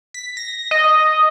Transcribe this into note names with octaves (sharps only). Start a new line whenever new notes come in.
B6
A#6
D#5